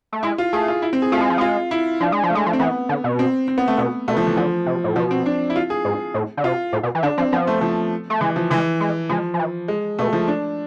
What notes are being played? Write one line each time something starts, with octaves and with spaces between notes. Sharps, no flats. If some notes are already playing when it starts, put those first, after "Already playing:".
A3
G#3 E4
F4
A3 G#4
F4
E4
C4
G#4
A3 F4
G#3
F3
G#3 F4
E4
F3 D4
G#3
F3
A3
G#3
F3
C4
E3 B3
D3
B2
C4
C4
B3
A3
B2 B3
B2 A3
F3
E3
D3 F3
C3
A2
B2 F3
C4
D4
E4
F4
G#4
G#2
A2
D3
C3 F4
A2
B2
E3
D3 D4
F3 C4
F3 B3
A3
F3
A3
E3 G#3
F3
E3 G#3
G#3
F3 G#3
F3
E3
G#3
B2 A3
F3
D4